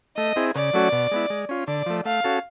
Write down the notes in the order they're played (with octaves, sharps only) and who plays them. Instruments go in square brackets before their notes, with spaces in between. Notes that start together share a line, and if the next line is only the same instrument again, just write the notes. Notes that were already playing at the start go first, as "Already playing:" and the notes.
[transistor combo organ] A3 [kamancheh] D#5
[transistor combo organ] C4 E4 G#4
[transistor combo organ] C#3 [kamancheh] D5
[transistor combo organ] F#3 A3 C#4 F#4
B2
G#3 B3 E4
G#3
C#4 F4
[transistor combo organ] D3 [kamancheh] D5
[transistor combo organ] F3 A3
[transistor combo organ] A3 [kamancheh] F5
[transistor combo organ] C#4 F#4 A4